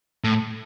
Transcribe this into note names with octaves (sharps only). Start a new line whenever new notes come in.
A2